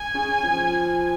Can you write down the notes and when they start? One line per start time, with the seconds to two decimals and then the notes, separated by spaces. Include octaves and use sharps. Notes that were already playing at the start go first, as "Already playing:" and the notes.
Already playing: G#5
0.14 C#3
0.44 F3